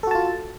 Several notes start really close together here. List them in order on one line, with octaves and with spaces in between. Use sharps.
A4 F#4 A5 F4